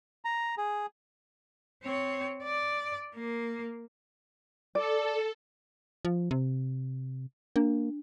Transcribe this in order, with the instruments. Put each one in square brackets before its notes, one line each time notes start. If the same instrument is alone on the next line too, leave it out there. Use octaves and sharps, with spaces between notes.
[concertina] A#5
G#4
[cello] C4 C#5
D5
A#3
[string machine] A4 [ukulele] D5
[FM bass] F3
C3
[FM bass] A#3 [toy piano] D4